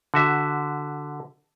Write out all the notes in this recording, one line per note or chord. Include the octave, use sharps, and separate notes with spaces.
D3 F#4 E5